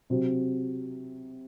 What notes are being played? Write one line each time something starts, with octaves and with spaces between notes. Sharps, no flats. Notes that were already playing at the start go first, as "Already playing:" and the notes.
C3 F#3 C4